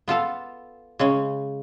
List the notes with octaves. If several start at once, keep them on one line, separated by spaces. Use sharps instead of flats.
B3 F4 A4 F5
C#3 G#3 C#4